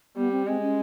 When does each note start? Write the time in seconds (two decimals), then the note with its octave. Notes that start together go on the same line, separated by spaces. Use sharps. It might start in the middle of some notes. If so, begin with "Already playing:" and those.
0.16 G3 B3
0.31 C4
0.46 G#3 C4
0.61 C#4